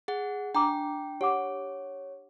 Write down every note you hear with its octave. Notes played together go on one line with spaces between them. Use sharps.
G#4 F#5
D4 G5 A#5 D6
G4 C#5 F#5 D6